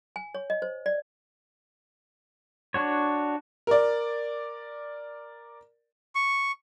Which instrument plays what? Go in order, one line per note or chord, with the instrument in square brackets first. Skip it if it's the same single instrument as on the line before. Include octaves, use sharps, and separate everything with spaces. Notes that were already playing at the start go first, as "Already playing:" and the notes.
[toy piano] G#5
C#5
D#5
C5
D5
[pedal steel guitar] D4 F#4 C#5
[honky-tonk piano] A#4 D5
[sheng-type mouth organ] C#6